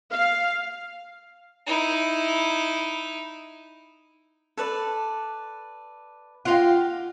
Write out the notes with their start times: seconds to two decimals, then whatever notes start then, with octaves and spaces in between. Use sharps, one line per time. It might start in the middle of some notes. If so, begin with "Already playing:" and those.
0.12 F5
1.67 D#4 E4
4.57 A4 B4 D5
6.45 D#4 F4 G4 F5 F#5